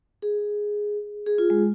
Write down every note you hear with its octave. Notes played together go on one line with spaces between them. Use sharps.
G#4
G#4
F4
G#3